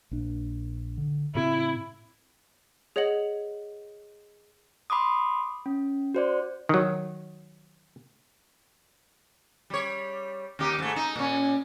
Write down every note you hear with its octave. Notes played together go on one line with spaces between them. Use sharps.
A#1 D4
D3
A2 C#3 C4 E4
G#4 C#5 D#5 F#5 F#7
B5 C6 D6 D#6
C#4
F#4 C5 D5
D#3 F#3
G3 C#5
D#2 D#4 G4
G#2 A3
D#4
A#2 C#4